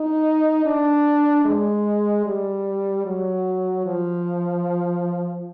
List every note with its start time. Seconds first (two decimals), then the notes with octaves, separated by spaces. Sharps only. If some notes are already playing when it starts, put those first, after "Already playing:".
Already playing: D#4
0.65 D4
1.45 G#3
2.26 G3
3.06 F#3
3.86 F3